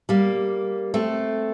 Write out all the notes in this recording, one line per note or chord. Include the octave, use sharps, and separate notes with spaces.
G3 A#3
A3 C4